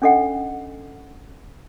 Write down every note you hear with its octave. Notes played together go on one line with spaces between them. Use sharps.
C#4 D4 A4 D#5 F#5 G5